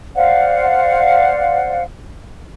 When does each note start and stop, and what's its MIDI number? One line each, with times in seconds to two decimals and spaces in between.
0.15 1.82 72
0.15 1.82 74
0.15 1.82 77
0.15 1.82 78